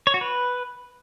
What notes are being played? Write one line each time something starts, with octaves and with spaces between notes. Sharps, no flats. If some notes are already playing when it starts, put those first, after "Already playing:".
C#5
F#4
B4